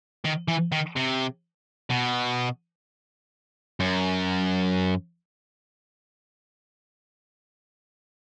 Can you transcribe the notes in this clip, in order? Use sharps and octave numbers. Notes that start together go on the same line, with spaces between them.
D#3
E3
D#3
C3
B2
F#2